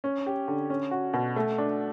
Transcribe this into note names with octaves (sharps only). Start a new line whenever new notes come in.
C#4
G4
D3
C#4
F#4
B2
A3
D4